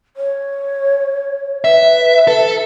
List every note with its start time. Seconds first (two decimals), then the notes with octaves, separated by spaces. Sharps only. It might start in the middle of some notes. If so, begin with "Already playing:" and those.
0.17 C#5
1.65 B4 E5
2.27 A4